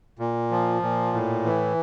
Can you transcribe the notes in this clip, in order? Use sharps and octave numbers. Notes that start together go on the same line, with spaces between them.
A#2
F3
A#2
A2
E3